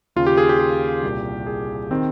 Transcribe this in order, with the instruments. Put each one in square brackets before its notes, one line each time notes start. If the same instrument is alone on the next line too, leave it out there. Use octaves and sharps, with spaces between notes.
[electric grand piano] D#2 C#3 F4
G4
G#4
G4
G4
C2 A#2
G#4
D#3 C4